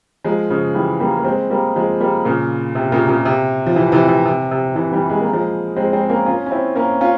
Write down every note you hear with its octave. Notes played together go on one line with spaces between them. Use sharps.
F3 G#3
C#3 F3
E3 G3
G3 A#3
A#3
G#3 C4
G3 A#3
F3 G#3
G3 A#3
A#2 C#3
C3
A#2 C#3
A#2 C#3
C3
F3
C3 E3
C3 E3
C3
C3
C3
C3 E3
E3 G3
G#3
A#3
F3 G#3
G#3 C4
G#3 C4
A#3 C#4
C#4 F4
C#4
C4 E4
A#3 C#4
C#4 F4